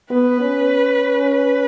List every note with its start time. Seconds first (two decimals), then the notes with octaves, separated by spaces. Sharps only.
0.10 B3 B4
0.41 C#4
1.34 B4